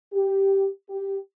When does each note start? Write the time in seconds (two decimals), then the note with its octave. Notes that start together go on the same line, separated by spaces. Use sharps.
0.13 G4
0.90 G4